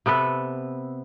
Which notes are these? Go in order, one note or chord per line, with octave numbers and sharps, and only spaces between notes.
C3 B3 A4 B4